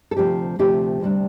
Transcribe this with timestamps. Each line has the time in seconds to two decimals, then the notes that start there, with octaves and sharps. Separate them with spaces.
0.11 A4
0.16 D2 C3 F3 A3 G4
0.59 D2 C3 F3 A3 G4
1.01 D2 C3 G3 D4